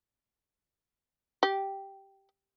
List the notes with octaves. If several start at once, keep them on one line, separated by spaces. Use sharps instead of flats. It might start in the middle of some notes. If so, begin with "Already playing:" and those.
G4